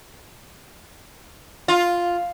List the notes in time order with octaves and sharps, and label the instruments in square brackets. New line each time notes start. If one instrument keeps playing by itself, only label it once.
[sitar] F4